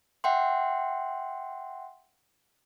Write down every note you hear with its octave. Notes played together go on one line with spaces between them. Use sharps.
E5 F#5 G5 C6